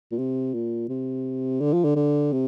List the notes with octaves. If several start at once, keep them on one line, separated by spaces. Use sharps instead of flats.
A#2
C3
A#2
C3
D3
F3
D3
D3
C3